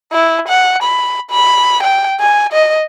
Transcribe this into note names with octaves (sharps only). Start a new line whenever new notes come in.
E4
F#5
B5
B5
G5
G#5
D#5